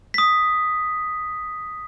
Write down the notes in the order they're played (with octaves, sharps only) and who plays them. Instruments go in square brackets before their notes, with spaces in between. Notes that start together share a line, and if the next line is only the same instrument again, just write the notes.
[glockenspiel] D#6 B6